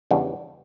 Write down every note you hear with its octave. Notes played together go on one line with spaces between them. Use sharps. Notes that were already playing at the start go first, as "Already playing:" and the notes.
E2 C#3 E3 G3 D4